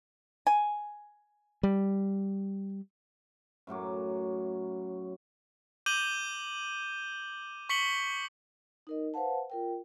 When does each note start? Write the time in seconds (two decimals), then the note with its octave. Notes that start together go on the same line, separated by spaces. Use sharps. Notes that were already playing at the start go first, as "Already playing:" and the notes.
0.47 G#5
1.63 G3
3.67 F#2 A2 F#3 D6
5.86 D6 G6 D#7 F#7 G7
7.69 C#6 B6 C#7 F#7 G7
8.87 D#4 A#4 D#5
9.14 B4 C5 F5 F#5 A5
9.50 F4 A#4 G5